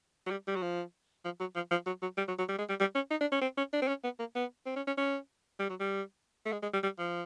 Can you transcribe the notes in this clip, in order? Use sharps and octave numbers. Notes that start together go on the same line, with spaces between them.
F#3
G3
G3
F#3
F3
F3
F#3
F3
F3
F#3
F#3
G3
F#3
F#3
G3
G#3
G3
G3
C#4
D#4
D4
C#4
C4
C#4
D4
C4
C#4
B3
A#3
B3
C4
C#4
C#4
C#4
G3
F#3
G3
A3
G#3
G#3
G3
G3
F3